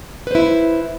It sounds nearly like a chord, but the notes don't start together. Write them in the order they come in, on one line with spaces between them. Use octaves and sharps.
B4 C5 E4